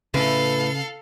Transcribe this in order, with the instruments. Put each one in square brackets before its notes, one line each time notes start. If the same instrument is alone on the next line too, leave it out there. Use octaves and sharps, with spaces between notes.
[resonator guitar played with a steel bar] A2 B4 [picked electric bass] C#3 C#4 [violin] A4 F5